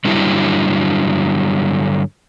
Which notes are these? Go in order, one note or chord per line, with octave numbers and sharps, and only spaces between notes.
G2 D3 F#3 G3 E4